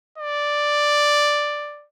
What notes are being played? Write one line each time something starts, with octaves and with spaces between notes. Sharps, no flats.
D5